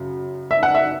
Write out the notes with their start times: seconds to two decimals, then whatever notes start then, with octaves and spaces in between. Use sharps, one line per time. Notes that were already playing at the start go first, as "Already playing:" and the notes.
Already playing: F#2 C#3
0.51 E5
0.63 F#5
0.75 E5